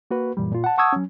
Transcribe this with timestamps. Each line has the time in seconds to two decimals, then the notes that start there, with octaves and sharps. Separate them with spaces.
0.11 A#3 F#4 B4
0.37 F#2 A#2 E3 G3
0.52 A#2 F4
0.64 F#5 A5
0.78 F#5 A5 C#6 D#6 E6 G#6
0.93 F#3 C#4